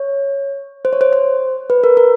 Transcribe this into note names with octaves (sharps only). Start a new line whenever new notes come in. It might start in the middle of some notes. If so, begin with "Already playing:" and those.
Already playing: C#5
C5
C#5
C5
C5
B4
A#4
A#4